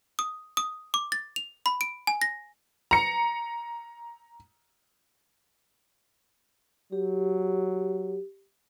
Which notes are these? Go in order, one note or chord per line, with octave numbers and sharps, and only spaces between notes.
D#6
D#6
D6
A6
F7
B5
D7
G#5
A#6
A#5 C#7
F#3 G4